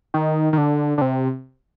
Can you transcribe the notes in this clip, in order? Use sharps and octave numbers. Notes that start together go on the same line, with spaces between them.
D#3
D#3
D3
D3
C3